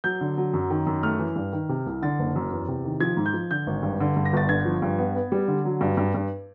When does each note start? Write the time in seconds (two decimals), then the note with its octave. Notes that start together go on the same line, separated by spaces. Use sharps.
0.04 F#3 G6
0.21 D3
0.38 F#3
0.54 F#2
0.70 D#3
0.87 F#2
1.03 A3 F6
1.19 E3
1.36 G2
1.53 D#3
1.69 C3
1.86 C2
2.02 D3 A6
2.19 F#1
2.36 F#2
2.52 E2
2.68 C3
2.85 D#3
3.00 F3 G#6
3.17 G#2
3.26 G6
3.34 F3
3.51 D3 G6
3.67 G#1
3.83 G2
4.00 D3
4.17 G2
4.25 A#6
4.33 G1 A6
4.49 D3 G#6
4.65 F3
4.82 G2
4.98 B3
5.16 B3
5.32 G3
5.48 D3
5.65 F#3
5.81 G2
5.97 G2
6.14 G2